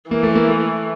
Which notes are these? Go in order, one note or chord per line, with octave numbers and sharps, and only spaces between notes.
E3 A#3
A3
A#3
A3